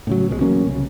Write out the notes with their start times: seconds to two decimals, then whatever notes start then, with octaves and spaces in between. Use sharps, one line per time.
0.07 A2 C#3 F#3
0.29 C2 B2 D3 G#3
0.41 A1 F#3 A#3 C#4
0.67 C2 C#3